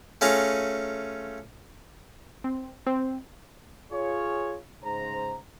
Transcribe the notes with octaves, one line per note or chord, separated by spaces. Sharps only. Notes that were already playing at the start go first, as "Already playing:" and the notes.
A3 C#4 F4 G#4 A#5
C4
C4
F4 G#4 C#5
G#2 C#3 C5 A#5